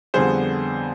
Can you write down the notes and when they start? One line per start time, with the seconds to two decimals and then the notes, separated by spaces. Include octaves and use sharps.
0.14 F2 D3 G3 B3 G#4 C5